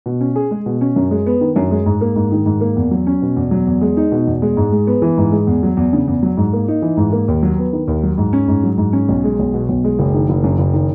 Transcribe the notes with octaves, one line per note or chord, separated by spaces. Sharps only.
B2
C#4
G#4
G#3
B2
C#4
F#2
G#3
B3
D#3
F#2
G#3
G#2
A#3
G#2
D#3
G#2
A#3
E2
F#3
C#4
B2
E2
F#3
E2
G#3
D#4
B2
E2
G#3
G#2
G#3
B3
E3
G#2
G#3
E2
F#3
E2
C#3
E2
F#3
G#2
A#3
D#4
E3
G#2
A#3
D#2
F#3
B3
D#3
D#2
F#3
G#2
C#4
G#2
F#3
G#2
C#4
B1
G#3
B1
B2
B1
G#3
F#1
D#3
F#1
F#2
F#1
D#3